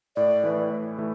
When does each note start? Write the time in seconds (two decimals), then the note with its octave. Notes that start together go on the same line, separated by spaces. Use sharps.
0.16 A2 D5
0.44 E3 A3 E4 B4
0.71 A2
0.98 E3 A3 E4